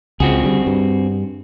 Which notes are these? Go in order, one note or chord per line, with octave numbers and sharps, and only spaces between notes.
C#2 C4 F#4 G#4
D3 G3
G2